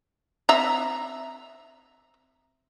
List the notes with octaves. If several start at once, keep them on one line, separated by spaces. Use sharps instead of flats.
C4 E5 A#5